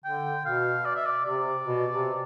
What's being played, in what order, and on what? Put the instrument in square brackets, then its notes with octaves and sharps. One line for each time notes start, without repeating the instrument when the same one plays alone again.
[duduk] D3 [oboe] G5
[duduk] B2 [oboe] F5
[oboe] D5
E5
D5
[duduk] C3 [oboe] D5
[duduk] B2
C3